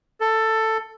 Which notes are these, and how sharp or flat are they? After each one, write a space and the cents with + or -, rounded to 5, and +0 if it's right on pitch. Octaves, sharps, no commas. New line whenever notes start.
A4 +10